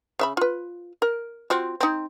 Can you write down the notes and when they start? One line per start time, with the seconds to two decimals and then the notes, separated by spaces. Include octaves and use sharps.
0.19 C#3 E5 B5
0.37 F4 B4
1.02 A#4
1.50 C4 F4 F#4
1.80 C4 D#4